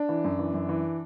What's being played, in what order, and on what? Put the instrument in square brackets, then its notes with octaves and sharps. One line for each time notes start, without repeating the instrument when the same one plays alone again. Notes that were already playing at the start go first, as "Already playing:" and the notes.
Already playing: [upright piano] D4
E3
F#2
E3
F#2
E3